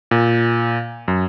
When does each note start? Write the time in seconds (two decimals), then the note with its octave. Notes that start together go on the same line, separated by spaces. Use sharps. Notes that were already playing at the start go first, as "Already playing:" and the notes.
0.11 A#2
1.08 F#2